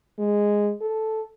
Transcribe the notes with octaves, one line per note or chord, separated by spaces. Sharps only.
G#3
A4